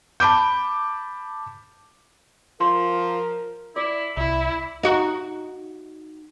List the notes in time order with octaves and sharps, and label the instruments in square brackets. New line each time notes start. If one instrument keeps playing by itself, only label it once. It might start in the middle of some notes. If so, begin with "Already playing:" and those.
[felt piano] A5 B5 D6 G6
[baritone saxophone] F3 [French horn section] A#4 [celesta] C6
[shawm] E4 [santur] D5
[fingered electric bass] C2 [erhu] E4 [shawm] E5
[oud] D#4 F#4